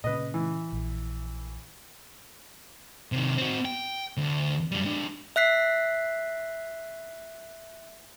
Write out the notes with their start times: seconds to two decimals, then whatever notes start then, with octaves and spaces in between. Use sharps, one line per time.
0.04 A#2 C#3 B4 D#5
0.34 E3
0.72 A#1
3.12 C3 D#3
3.38 C4 F#4
3.65 G5
4.17 D2
4.72 F#2 G3
4.85 G#3 D4
5.36 E5 F#6 B6 C7